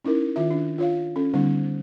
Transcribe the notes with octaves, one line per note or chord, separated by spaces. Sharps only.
C#4 D#4 E4 A#4
D#3 F4 E5
D4
F4 C#5 F5
C#4 A4
D3 G3 B3 C#4 D#4 C5